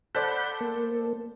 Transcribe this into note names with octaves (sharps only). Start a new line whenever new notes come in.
A4 C5 D5 F#5 B5 G6
A#3